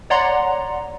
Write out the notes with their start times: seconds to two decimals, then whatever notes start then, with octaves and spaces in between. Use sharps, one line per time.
0.10 C#5 D5 F#5 A#5 C6